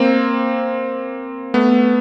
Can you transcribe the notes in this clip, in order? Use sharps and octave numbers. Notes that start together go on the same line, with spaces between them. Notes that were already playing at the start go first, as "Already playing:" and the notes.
Already playing: A#3 C4
A3 B3